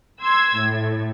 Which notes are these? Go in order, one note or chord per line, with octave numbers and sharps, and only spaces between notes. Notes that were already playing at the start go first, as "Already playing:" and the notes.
C6 E6 G#6
A2